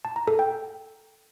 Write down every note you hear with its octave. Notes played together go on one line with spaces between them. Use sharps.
A5
A#5
A4
G5